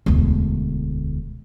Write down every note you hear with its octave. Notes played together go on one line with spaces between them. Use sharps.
E1 D2